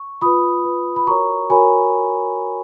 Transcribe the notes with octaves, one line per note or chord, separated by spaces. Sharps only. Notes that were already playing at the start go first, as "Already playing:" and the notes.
Already playing: C#6
F4 B4 B5 D#6
F4 B4
B5
F#4 A#4 C#5 A#5 C#6
F#4 A#4 C#5 G#5 B5